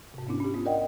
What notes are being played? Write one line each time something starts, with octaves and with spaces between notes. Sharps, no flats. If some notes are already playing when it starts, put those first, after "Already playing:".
G#2 C3
G#2 B3 C#4 D4 E4
C#4 G4
B3 F4
A#4 D5 D#5 F#5 G5